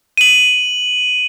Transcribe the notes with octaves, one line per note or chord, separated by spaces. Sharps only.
D#7 F#7